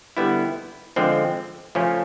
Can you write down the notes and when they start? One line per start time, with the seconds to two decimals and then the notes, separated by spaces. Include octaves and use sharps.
0.17 D3 G3 B3 E4
0.96 D3 F3 G#3 C4
1.75 C#3 F3 A3 C#4